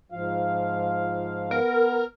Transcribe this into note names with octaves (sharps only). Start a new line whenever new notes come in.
G#2 F3 F4 F5
B3 A#4